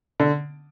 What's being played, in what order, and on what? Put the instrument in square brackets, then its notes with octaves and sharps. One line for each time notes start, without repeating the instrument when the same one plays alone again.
[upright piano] D3